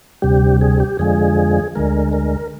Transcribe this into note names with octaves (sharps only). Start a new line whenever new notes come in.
D2 C3 G3 G4
G#4
G4
F2 D3 F3 G#3 G#4
D2 D3 G#3 A#4
A#4